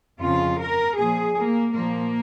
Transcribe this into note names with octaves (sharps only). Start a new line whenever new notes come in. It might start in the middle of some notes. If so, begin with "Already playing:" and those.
F2 C#3 F3 F4
A#4
A#2 F3 G#4
A#3
A#2 F3 A#3